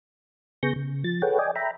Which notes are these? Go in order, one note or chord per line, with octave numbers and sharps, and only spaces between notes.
C#3 B3 G#4 C#6 G6 A#6
C#3
F3 A6
G#4 A4 B4 C#5 F#5 G5
D5 D#5 G5 G#5
E5 G5 A#5 B5